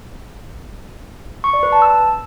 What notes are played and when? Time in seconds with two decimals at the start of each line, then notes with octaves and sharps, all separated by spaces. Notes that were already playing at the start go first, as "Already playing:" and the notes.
1.44 C#6
1.53 D5
1.63 B4
1.72 A5
1.82 E6